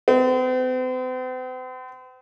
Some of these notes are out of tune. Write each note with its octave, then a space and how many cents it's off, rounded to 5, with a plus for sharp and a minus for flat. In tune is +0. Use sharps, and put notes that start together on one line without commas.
C4 -45